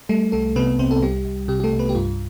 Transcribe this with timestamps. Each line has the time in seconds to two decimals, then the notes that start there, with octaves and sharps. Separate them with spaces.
0.09 G3 A3 A4
0.32 C2 A3 A4
0.56 C3 B3 B4
0.79 C2 C4 C5
0.91 A4
1.02 G3 G4
1.25 C2
1.48 C3 G4
1.60 G4
1.64 A3 A4
1.73 C2
1.79 B3 B4
1.89 G4
1.95 G2 F4